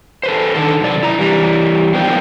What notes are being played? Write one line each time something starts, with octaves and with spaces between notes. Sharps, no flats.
A4 B4 C5
D3 D#3 A4
F#2 C3 D5
E4 A#5
E3 G3
F3 B3 D4 A#4 C5 G5